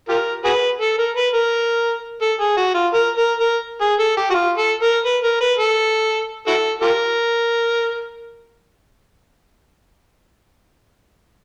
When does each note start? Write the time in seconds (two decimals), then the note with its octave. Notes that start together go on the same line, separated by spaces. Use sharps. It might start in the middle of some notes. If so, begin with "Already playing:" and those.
0.09 F4 G4 A#4
0.45 F#4 G#4 B4
0.81 A4
0.98 A#4
1.16 B4
1.34 A#4
2.22 A4
2.40 G#4
2.57 F#4
2.75 F4
2.93 A#4
3.17 A#4
3.40 A#4
3.81 G#4
3.99 A4
4.17 G4
4.30 F#4
4.34 F4
4.58 A4
4.82 A#4
5.05 B4
5.24 A#4
5.41 B4
5.59 A4
6.47 E4 F#4 A4
6.82 F4 G4 A#4